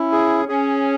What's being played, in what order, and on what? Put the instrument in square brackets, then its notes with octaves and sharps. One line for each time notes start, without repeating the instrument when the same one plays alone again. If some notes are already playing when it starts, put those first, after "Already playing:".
Already playing: [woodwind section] C#4 [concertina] E4
[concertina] G#4
[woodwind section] C#4 [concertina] G#4